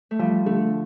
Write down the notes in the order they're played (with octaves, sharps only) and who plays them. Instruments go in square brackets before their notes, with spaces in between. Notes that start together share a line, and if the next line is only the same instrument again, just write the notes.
[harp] A3
[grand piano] F3 [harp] G3
[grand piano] D3 [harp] A3